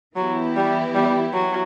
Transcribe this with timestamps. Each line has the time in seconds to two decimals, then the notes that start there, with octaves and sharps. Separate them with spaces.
0.16 E3 F#3 B3 E4 G4
0.56 G3
0.95 G3
1.33 F#3